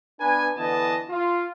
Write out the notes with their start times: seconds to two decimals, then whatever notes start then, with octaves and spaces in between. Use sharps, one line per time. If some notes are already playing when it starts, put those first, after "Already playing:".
0.20 B3 D4 B4 G#5
0.57 D3 E3 B3 D#5 A5
1.09 F4